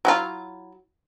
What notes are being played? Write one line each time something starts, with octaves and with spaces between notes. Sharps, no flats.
F#3 E4 F4